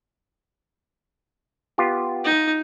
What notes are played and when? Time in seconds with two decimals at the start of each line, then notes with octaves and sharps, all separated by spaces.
1.78 B3 F4 G4
2.24 D#4